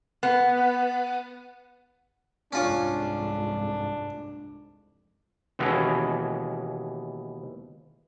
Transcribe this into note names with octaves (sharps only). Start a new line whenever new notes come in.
B3
C2 F2 G#2 C#4 D4 F4 C#6
D#2 B2 E3 G#3 C#4